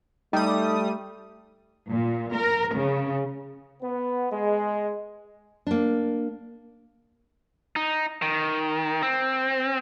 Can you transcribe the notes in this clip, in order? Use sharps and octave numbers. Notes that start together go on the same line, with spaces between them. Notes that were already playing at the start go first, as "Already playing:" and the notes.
G3 A3 D#4 A4 D#6
A#2
A#4
C#3
B3
G#3
A#3 D4
D#4
D#3
C4